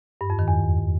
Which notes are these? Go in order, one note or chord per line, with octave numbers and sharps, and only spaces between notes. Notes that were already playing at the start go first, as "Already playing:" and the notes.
G2
F2
D#3
E2